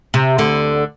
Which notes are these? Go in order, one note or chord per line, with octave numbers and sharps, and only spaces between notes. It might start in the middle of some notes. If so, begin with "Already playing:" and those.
C3
D2 D3